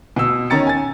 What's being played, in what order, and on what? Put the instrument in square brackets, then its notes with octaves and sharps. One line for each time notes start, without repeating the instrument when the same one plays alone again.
[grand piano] B2 E6
D#3 C#4 A#5 A6 C#7
G#5 A6